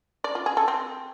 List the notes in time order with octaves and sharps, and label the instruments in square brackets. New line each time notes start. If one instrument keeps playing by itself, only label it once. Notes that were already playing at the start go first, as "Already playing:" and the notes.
[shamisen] D5
F4
G#4
A4
C4